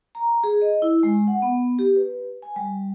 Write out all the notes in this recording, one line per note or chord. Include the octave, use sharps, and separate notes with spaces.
A#5
G#4
D#5
E4
G#3
F#5
B3
G4
B4
G#5
G3